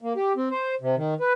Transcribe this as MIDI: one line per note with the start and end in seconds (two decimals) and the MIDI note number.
0.02 0.13 58
0.16 0.33 67
0.37 0.49 60
0.51 0.75 72
0.81 0.95 48
0.96 1.14 51
1.21 1.33 71